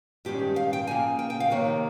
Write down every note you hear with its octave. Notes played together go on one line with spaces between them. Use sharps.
G2 D#3 G#3 C#4 G4
F5
G5
C#3 F3 A#3 G#5
G5
G5
F5
C3 D#3 A#3 C#5